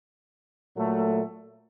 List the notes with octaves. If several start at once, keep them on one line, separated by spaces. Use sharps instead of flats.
A#2 F#3 A3